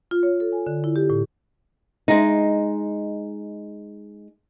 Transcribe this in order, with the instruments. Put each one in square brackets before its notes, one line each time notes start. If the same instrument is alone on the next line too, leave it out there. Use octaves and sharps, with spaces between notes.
[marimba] F4
C#5
A4
G#5
D3
E4
G4
A2
[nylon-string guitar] G#3 D#4